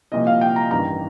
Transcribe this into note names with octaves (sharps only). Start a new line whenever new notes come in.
C2 A#2 F3 D#5
F5
G5
A#5
A1 G2 D#3 A#5